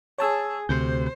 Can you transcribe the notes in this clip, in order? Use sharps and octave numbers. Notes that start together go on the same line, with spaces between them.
G#4 C#5 A5 E6
D2 C3 C5 G6